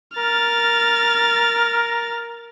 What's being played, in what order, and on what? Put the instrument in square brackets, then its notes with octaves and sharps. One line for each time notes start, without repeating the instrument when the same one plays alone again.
[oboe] A#4 [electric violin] F6 A6